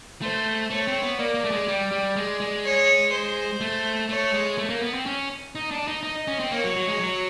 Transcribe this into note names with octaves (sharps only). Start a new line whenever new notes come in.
A3 C5
A3 C#5
C4
B3
A#3 D5
A#3
A3
G#3
G3
G3
G#3
G#3
C#5
C5
A3
A3 C#5
G#3
A3
A#3
B3
C4
C#4
D#4
D4
D#4
D#4 D#5
C#4
C4
A#3 C#5
F#3
F#3
G#3
F#3